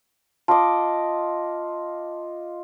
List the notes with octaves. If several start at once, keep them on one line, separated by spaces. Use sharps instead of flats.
F4 D#5 A5 D6